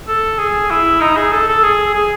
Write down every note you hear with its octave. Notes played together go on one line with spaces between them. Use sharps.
A4
G#4
E4
D#4
G#4
A4
A4
G#4
G#4